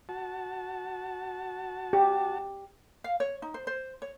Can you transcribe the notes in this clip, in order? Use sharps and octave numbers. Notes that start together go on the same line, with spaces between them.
F#4 A5
G4
F5
C#5
D#4
C5
C5
C#5